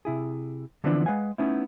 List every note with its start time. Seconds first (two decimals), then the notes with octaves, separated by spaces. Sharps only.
0.05 C3 E4 G#4
0.84 D3 E3 F3 B3 C4 D4
1.06 G#3 B4 F5 F#5 G#5
1.38 A3 B3 C#4 D#4 E4